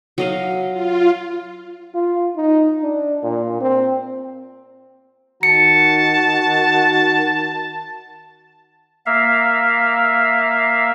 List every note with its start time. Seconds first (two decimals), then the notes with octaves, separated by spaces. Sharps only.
0.18 F#3 D#5 F5
0.72 F4
1.94 F4
2.36 D#4
2.82 D4
3.23 A#2
3.61 C4
5.43 D#3 F#4 A5 C#7
9.06 A#3 E5 F5